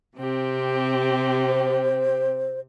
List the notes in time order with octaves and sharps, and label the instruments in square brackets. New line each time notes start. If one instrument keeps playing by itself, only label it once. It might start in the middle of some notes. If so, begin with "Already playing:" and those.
[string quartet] C3 C4 G4
[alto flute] C5